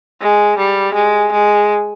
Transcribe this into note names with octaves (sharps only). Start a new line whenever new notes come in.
G#3
G3
G#3
G#3